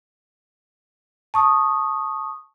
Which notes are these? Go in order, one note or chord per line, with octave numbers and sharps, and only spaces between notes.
A5 C#6 D#6